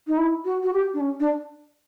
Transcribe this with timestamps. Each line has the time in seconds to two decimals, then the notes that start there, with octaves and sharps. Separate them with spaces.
0.07 D#4
0.18 E4
0.45 F#4
0.63 F#4
0.73 G4
0.93 D4
1.00 C#4
1.20 D4